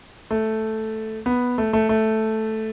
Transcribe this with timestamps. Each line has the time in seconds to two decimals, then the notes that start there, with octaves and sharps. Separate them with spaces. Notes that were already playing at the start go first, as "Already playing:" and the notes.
0.31 A3
1.26 B3
1.58 A3
1.73 A3
1.89 A3